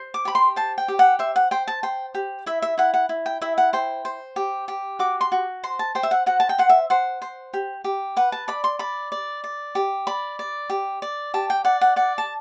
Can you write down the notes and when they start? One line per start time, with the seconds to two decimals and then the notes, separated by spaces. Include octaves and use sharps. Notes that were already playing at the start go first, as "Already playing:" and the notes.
Already playing: C5
0.14 D6
0.25 G4 B5
0.35 C6
0.56 C5 A5
0.78 G5
0.88 G4
0.99 F#5
1.19 C5 E5
1.36 F#5
1.51 C5 G5
1.68 A5
1.83 C5 G5
2.14 G4
2.46 E4 E5
2.62 E5
2.78 E4 F#5
2.94 F#5
3.09 E4
3.26 G5
3.41 E4 E5
3.58 F#5
3.73 C5 G5
4.05 C5
4.36 G4
4.68 G4
4.99 F#4 D6
5.21 C6
5.32 F#4
5.63 C5 C6
5.79 A5
5.95 C5 G5
6.03 E5
6.11 F#5
6.26 F#4 F#5
6.40 A5
6.49 G5
6.58 C5 F#5
6.69 E5
6.90 C5 F#5
7.22 C5
7.54 G4
7.84 G4
8.17 B4 F#5
8.32 A5
8.48 D5 B5
8.64 C6
8.79 D5 B5
9.12 D5
9.44 D5
9.75 G4
10.07 D5 B5
10.39 D5
10.70 G4
11.02 D5
11.34 G4 A5
11.50 G5
11.65 D5 F#5
11.81 F#5
11.96 D5 F#5
12.18 A5